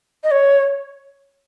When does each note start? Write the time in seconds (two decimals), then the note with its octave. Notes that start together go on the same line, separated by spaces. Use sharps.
0.23 D#5
0.31 C#5